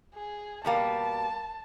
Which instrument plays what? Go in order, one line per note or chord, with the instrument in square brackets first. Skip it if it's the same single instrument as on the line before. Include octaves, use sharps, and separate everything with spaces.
[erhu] G#4
[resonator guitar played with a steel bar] B2 G3 A#3 [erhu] A5